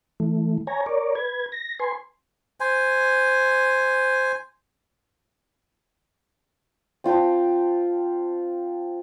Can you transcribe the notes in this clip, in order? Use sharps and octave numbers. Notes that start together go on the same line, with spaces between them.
E3 A3
C#5 G#5 A#5
A#4 C#5 D5
B4 G#6
A#6
B4 G#5 C6
C5 G#5
C4 F4 G5 A5